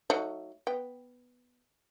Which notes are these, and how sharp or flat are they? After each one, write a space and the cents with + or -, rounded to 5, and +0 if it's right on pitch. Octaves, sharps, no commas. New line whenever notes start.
F#3 +0 A3 +25 D#4 +15
B3 +0 G5 +0